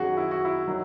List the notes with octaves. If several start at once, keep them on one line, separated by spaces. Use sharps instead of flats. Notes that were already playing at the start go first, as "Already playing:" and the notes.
Already playing: F#2 D#3 F#3 F#4 G#4
E4
F#4
E4
D#3 F#3